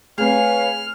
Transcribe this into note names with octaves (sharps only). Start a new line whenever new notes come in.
A3 C4 G#4 B4 C#5 F5 F6